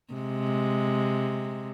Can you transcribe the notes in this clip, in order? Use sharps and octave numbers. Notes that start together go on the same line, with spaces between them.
C3 G#3